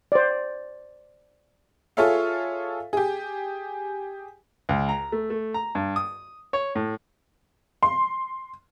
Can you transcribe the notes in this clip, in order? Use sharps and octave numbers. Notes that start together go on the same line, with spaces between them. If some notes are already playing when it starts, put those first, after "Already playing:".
C5 D5
F4 G#4 A4 C#5 E5 F5
G4 G#4
C#2
A#5
A3
A3
A#5
G2
D#6
C#5
A2
C6